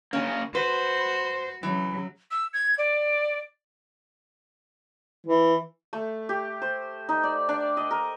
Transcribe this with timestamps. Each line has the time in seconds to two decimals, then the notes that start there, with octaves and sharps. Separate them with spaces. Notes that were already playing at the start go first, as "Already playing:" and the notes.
0.13 C#3 A#3 C#4
0.55 F#4 B4 C5
1.63 C#3 E3 F#3
2.31 E6
2.54 G#6
2.78 D5
5.27 E3
5.93 A3
6.29 G4
6.62 C5
7.09 D#4
7.23 D5
7.49 D4
7.77 D#5
7.91 A#4